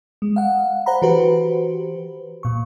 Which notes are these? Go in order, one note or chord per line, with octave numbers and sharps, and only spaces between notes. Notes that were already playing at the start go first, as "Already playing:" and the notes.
G#3
F5 F#5
C5 F#5 A#5 B5
E3 F#4 G4 B4 C5
A#2 C#6